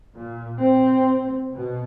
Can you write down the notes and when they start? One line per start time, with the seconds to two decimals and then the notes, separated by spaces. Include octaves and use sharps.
0.15 A#2
0.60 C4
1.54 B2